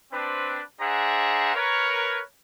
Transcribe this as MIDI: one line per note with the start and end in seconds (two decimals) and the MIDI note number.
0.12 0.61 60
0.12 0.61 62
0.12 0.61 71
0.81 1.55 62
0.81 1.55 68
0.81 1.55 72
0.81 1.55 76
0.81 1.55 78
0.81 1.55 82
1.55 2.21 70
1.55 2.21 71
1.55 2.21 73